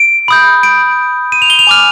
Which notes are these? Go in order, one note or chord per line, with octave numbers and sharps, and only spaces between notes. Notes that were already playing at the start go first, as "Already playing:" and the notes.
Already playing: D7
B5 D#6 G6
D7
D#7
F7
G7
F7
G#5 D6 F6